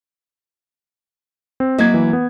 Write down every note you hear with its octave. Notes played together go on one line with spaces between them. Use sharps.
C4
F#3 A#3 E4 D#5 G#6
E3
B3